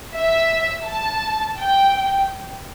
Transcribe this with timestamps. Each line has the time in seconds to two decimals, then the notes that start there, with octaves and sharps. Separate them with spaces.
0.15 E5
0.87 A5
1.59 G5